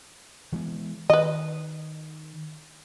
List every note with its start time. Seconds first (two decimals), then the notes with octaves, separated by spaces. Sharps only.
0.52 E3 G#3 B3
1.10 D#3 B4 D#5